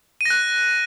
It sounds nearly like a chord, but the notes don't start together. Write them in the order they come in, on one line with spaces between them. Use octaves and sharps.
D#7 A#6 F#6